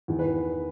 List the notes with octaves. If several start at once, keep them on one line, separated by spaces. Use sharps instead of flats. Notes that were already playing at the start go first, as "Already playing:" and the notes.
E2 D#3
B4